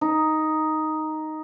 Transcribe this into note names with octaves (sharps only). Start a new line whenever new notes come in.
D#4